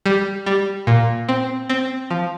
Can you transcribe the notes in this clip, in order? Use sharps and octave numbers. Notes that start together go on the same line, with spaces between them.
G3
G3
A#2
C4
C4
F3